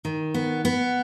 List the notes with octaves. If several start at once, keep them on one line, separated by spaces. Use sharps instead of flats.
D#3
B3
B3